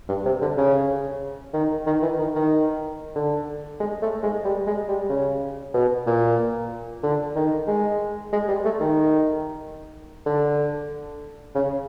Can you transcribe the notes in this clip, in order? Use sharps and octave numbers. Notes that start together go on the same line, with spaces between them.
G2
C3
D3
C#3
D#3
D#3
E3
D#3
D#3
D3
G#3
A3
G#3
G3
G#3
G3
C#3
B2
A#2
D3
D#3
G#3
G#3
G3
A3
D#3
D3
C#3